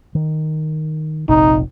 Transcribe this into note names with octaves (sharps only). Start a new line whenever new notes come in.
D#3
F1 A#1 C3 D#4